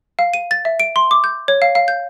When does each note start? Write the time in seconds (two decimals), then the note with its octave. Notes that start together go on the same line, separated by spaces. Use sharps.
0.19 F5
0.34 D#7
0.51 A6
0.65 E5
0.80 D7
0.96 C6
1.11 D6
1.24 G6
1.48 C#5
1.62 F5
1.75 F5
1.88 G6